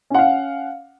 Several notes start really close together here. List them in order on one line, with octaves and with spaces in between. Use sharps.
C#4 F#5 F5